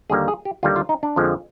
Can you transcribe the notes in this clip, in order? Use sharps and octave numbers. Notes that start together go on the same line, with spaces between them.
D#2 D3 G3 A#3 G#4
G#4
G4
D#2 D3 G3 A#3 F4
F4
D#4
D4
F2 D3 F3 G#3